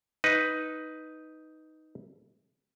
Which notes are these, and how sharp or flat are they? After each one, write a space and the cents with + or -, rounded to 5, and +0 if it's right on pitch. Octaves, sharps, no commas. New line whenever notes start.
D#4 +5 B4 +0